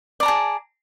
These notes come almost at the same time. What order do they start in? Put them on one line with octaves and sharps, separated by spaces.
D5 A#5 A5 G#4